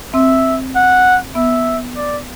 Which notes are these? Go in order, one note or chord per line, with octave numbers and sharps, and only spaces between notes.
C4 E5
F#5
B3 E5
D5